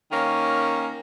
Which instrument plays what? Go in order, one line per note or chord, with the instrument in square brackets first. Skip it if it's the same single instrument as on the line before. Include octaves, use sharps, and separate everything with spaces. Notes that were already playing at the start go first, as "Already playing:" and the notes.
[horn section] D#3 A#3 C#4